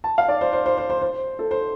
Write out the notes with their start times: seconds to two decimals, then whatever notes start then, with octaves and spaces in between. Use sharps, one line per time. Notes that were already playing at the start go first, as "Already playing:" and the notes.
0.04 A5
0.18 F5
0.28 D5
0.41 C5
0.53 C5
0.66 C5
0.77 C5
0.90 C5
1.02 C5
1.39 A4
1.51 C5